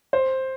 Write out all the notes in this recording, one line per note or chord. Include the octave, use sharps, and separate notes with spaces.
C5